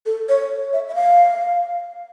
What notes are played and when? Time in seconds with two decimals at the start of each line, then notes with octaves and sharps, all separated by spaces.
0.06 A4
0.29 C#5
0.73 E5
0.89 E5
0.95 F5